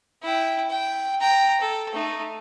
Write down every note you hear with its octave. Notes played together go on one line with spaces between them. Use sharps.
E4 G5
G5
G5 A#5
A4
A3 D#4